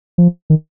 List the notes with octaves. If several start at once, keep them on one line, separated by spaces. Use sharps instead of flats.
F3
D#3